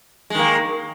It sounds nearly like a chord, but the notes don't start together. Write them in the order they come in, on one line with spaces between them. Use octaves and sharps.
G#3 D#3 A#3